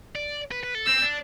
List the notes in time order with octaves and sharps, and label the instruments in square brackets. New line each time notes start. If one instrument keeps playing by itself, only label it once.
[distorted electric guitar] D5
B4
B4
A4
[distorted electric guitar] C4 [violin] E6
[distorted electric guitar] D4